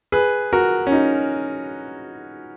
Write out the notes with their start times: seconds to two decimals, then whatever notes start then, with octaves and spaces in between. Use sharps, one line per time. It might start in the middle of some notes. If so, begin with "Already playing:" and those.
0.12 G#4 B4
0.53 F#4 A#4
0.87 C#4
0.92 D#4